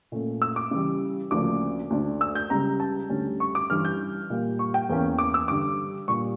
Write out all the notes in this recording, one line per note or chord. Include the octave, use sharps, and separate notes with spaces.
A#2 A3 C#4
E6
D6
C#3 E3 G3
D2 C#3 F3 A#3 D4 D6
D2 D3 A3 D4
E6
G6
C#2 C#3 G3 A#5
A5
D2 D3 G3 C#4
C#6
D6
G2 E3 G3 C#4 F6
G6
A#2 G3 A#3
C#6
G5
E2 E3 A#3 C#4
D6
E6
G2 D3 G3 D6
A#2 G3 D4 C#6